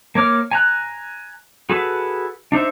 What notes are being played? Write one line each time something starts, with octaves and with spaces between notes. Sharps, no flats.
A#3 C#5 D6 F6
G#5 A#5 F#6
F#4 G#4 A4 B4
D4 D#4 C5 E5